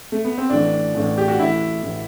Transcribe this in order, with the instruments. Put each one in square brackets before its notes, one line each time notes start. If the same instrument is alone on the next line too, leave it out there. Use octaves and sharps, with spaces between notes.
[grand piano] A3
B3
C4
[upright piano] A1 A2 E3 [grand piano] D4
[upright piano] A1 A2 E3
[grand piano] G4
F#4
[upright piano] A1 A2 E3 [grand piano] E4
[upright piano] A2 E3